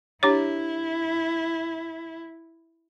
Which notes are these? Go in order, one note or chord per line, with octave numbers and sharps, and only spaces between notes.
D4 E4 G4 C#5